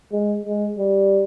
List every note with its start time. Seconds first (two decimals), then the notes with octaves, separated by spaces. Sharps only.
0.12 G#3
0.46 G#3
0.78 G3